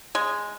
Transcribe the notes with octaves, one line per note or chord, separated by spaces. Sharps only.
G#3